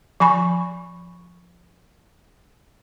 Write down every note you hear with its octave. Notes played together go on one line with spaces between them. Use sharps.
F3 G#5 B5 C#6